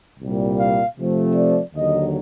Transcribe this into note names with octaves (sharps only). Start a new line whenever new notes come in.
C2 A#2 G3
F5
C3 F3 A3 C4
D5
D#2 D3 F#3 D#5